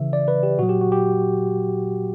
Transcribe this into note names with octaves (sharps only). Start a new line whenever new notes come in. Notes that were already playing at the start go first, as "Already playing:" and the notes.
Already playing: C#3 E3 E5
D5
B4
G4
A#2 F#3 F#4
G4
F#4
G4